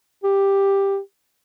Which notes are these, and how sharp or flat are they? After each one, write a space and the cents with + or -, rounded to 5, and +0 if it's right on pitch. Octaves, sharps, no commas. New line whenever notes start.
G4 +5